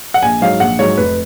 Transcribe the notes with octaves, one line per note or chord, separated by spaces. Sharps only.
F#5
A#1 G#5
G#2 F#3 F5
A#1 F#5
G#2 F#3 C#5
F1 B4